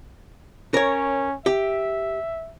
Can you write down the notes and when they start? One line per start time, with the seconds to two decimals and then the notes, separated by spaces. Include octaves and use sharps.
0.74 C#4 A#4 C#5
1.46 G4 E5